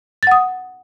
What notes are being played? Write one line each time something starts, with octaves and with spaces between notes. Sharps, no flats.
F#5 D#6 A6